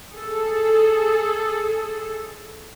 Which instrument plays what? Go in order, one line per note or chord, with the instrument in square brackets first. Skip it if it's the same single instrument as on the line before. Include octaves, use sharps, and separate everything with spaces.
[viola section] G#4 A4